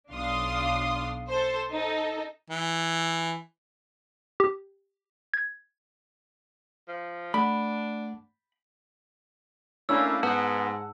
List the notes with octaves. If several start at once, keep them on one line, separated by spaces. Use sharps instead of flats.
B1 D4 F5 C6 D#6
A4 C5
D#4 A4
E3
G4
G#6
F3
A3 D4 F#5 B5
A3 A#3 C#4 D4 E4 E6
G#2 B3 F#5 A5